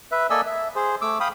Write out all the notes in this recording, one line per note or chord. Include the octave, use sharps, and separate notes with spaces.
B4 E5
A#3 A4 D5 D#5 G#5 E6
E5
G#4 C5
A3 D6 E6
F5 G5 B5 D#6